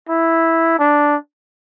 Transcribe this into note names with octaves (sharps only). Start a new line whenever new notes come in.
E4
D4